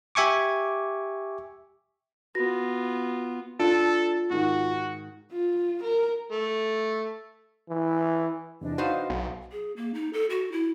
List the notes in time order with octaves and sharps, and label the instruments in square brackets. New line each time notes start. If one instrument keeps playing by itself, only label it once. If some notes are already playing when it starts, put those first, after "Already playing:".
[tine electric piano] G4 E5 G#5 C#6 D6
[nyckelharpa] B3 F4 [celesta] F#4 A#6
[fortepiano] D4 [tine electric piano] F4 [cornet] A4
[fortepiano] G#2 D#3 [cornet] F#4
[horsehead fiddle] F4
A#4
[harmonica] A3
[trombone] E3
[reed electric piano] E2 C3 E3 [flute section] D4 D#5
[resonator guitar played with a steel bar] D#4 B4 C5 [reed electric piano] F#4 F5
[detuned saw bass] B1
[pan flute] G#4
A#3
D#4
A4
F#4
E4